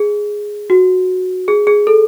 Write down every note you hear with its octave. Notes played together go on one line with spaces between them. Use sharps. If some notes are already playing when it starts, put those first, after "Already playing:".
Already playing: G#4
F#4
G#4
G#4
A4